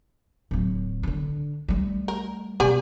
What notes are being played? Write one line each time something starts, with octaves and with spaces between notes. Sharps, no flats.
D1 F#3
D3 D4
G3 A3
A#4
B2 G4 D5 G#5